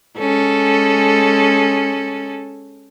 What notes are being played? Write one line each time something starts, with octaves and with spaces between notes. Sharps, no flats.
G#3 C#4 A4